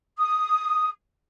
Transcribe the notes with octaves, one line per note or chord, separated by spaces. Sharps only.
D#6